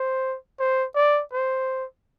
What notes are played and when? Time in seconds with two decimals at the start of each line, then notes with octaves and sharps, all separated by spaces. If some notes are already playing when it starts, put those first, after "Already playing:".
Already playing: C5
0.59 C5
0.95 D5
1.33 C5